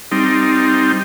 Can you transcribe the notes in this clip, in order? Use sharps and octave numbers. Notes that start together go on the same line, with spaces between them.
G3 C4 D#4